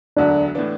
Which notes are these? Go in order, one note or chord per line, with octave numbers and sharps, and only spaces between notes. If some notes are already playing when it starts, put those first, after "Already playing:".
E1 D2 D3 F#3 D4
A2 E3 B3 D4